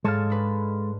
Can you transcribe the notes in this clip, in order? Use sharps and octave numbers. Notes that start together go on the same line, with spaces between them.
G#2 G#3 A4 C#5 F5 A5
D4 B4